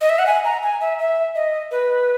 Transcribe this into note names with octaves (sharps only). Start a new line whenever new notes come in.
D#5
E5
F#5
G#5
A#5
G#5
E5
E5
D#5
B4